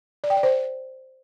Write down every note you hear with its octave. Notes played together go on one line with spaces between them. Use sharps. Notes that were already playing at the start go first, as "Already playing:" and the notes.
D5
G5
D5
C5